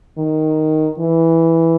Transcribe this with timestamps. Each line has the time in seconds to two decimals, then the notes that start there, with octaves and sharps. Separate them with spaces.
0.18 D#3
0.99 E3